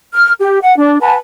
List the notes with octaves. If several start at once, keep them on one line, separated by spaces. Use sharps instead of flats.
F6
G4
F#5
D4
B4 F#5 G#5 A5